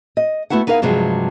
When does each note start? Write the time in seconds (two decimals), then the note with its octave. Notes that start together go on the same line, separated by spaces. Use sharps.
0.17 D#5
0.50 A3 B3 E4 F#4 F#5
0.67 B3 D#4 E4 A#4 F5
0.82 G2 C3 F3 F#3 G#3